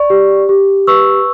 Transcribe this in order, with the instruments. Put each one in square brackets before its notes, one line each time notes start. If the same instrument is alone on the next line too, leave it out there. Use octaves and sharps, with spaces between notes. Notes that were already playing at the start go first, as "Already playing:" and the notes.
Already playing: [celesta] D5 C#6
G4
G4
B4 C#6 E6